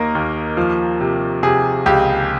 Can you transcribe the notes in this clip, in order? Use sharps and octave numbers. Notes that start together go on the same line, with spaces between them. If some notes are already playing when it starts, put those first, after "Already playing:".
Already playing: D#2 A#3 D#4 A#4 D#5
D#2
F3
C3
C3 G#4
C#2 G4